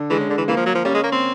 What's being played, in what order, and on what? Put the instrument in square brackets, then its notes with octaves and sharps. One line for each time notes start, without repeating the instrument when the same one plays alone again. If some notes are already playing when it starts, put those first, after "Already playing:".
Already playing: [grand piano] D3
[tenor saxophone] E3 [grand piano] G#3
[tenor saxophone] C#3
D3
E3
[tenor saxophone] E3 [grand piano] A#3
[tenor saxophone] F3
F#3
F3
[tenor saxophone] G3 [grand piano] C#4
[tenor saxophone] G#3
A#3
C4